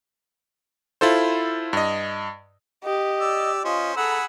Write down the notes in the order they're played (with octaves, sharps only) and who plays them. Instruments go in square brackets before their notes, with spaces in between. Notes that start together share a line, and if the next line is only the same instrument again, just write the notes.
[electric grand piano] E4 F4 A4 C5
G2 D#5
[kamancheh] G4 [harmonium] D#5
[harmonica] D5 E6
[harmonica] C#4 C5 [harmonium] F4 D#5
[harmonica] G#4 F#5 B5 [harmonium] A4 A#5 [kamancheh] E6